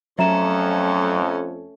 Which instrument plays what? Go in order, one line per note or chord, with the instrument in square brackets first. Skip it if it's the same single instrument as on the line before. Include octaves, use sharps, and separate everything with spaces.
[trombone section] F2 [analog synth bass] F#3 [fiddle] A3 C#4 [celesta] E5 A#5 E7